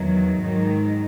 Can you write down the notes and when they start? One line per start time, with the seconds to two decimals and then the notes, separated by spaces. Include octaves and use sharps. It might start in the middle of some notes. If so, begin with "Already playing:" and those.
Already playing: E2 D#3 F#3
0.38 G#2 D#3 F#3